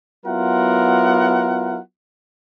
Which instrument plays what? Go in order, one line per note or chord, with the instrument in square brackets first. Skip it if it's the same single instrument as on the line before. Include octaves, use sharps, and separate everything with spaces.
[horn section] F#3 B3 E4 F4 A#4 F#5